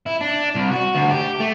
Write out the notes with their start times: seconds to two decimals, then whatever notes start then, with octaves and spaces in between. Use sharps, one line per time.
0.06 E4
0.21 D4
0.55 C2
0.72 F#4
0.95 D2
1.11 G4
1.40 A3